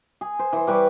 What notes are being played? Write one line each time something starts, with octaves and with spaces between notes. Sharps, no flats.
G#4
C5
E3 C6
G3 B4 C#6 D6